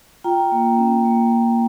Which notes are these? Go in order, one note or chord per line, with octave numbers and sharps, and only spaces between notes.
F4 G5 A#5
A#3
C#4
A#3
F4